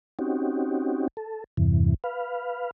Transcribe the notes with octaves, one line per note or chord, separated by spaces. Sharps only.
C4 C#4 D#4 F#4 G4
A4
E2 G2 C3 E3
B4 F5